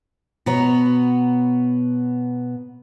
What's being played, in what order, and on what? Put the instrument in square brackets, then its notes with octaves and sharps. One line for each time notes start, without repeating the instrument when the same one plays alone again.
[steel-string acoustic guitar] B2 B3 C#5 A#5